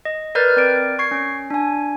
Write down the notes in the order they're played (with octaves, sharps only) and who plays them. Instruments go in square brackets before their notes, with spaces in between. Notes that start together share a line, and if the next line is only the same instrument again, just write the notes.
[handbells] D#5
A#4 B4 D5 F6 G6 A6
C4 A#4 D5 D7
C#6 G#6 C7
C#4
D4 G#5